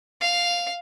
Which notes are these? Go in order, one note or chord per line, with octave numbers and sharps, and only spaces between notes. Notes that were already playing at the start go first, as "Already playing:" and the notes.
F5